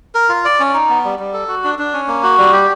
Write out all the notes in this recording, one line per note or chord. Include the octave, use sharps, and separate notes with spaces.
A#4
F4
D5
C#4
D#4
B3
G3
G3
A4
F#4
D4
D4
C#4
A#3
F#4
G3
G4